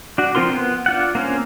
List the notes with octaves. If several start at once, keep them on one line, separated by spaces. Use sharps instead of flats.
D4 F#4
F3 C4 F4 A#4 C6
B3
D4 F4 F#5
A#3 C4 C#4